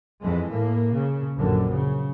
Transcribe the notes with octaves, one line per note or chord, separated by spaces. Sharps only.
F2 E3 G#3
A2 A#3
C#3
A#1 F#2 D3
C#3